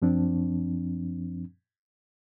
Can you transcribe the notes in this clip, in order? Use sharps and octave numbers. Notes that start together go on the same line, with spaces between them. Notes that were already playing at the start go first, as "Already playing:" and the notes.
F#2 F3 C4 D4